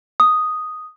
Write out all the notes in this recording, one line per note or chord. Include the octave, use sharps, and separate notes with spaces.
D#6